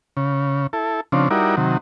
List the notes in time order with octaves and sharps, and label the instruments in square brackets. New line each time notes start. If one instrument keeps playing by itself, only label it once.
[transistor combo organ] C#3
E4 A4
C#3 F3 C4 D4
G3 D#4 E4 F#4 A#4 D5
C3 D#3 F#3